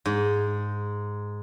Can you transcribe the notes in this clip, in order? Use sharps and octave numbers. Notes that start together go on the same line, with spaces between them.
G#2